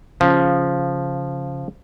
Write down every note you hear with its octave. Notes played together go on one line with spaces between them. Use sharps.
C#3 F3